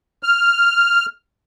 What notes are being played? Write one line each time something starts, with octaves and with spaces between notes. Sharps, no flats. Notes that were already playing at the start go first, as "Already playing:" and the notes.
F6